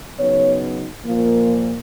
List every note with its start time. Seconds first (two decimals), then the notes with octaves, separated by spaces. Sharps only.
0.17 C#3 F#3 B3 D#4 C#5
1.05 A#2 F3 A#3